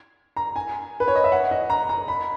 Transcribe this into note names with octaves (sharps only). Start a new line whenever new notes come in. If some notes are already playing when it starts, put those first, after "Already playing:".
A#5
G#5
B4
C#5
D#5
E5
F#5
D#5
A#5
A#5
B5